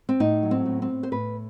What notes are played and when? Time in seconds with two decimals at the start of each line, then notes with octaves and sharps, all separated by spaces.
0.09 C4
0.20 A2 D#4
0.43 F#3
0.51 C4
0.65 A2
0.82 C4
0.89 A2
1.03 C5
1.12 A2 B4